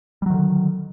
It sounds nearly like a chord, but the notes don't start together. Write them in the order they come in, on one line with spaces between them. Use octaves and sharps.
G3 F#3 D#3 D3